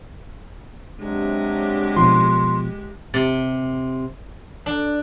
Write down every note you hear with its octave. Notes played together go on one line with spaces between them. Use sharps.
C3 F#3 G#3 D4 G4
B2 F3 C6
C3
D4